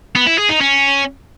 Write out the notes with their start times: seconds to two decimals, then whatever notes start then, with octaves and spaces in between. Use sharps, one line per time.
0.15 B3
0.27 E4
0.38 G#4
0.50 D#4
0.61 C#4